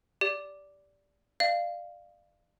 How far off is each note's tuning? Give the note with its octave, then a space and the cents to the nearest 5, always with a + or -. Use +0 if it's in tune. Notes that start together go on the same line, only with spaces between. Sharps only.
G4 +0 D5 -15
D5 +35 F5 -10